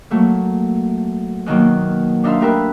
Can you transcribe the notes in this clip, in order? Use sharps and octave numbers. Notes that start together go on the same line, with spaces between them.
F#3 A3 A#3
B2 D#3 F#3 A#3
D4 D#4 A#4 E5 F5 C6
A3 G4 A#4 B4 E5